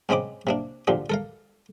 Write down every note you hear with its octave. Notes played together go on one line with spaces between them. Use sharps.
G#2 C#3 C4 D#4 B5 D6
C3 A#3 D4
A#2 D3 F3 G4
A4 A#4 F5